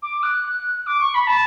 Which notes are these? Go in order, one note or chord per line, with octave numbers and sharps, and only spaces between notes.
D6
F#6
D6
C#6
B5
A5